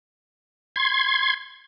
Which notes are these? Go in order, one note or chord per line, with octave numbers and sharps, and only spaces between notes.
C6 G#6